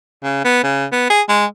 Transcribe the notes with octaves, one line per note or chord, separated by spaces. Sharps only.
C#3
B3
C#3
B3
G#4
G#3